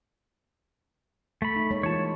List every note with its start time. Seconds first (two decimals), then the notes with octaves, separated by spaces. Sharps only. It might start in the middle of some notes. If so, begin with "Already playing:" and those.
1.42 A3 B5
1.56 D#4
1.71 G#3 A#3 C#5
1.83 E3 F4 C#5 A5